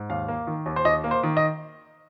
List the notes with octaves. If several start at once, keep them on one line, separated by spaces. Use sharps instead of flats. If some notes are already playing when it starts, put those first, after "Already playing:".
Already playing: G#2
D#2 F5
A#3
D#3
D#2
C5
D#2 D#5
A#3
C5
D#3
D#5